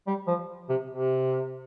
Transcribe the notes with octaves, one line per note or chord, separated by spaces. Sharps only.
G3
F3
C3
C3